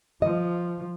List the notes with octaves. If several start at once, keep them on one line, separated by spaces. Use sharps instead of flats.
F3 D#5